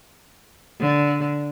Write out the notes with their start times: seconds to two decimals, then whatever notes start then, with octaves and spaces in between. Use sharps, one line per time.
0.80 D3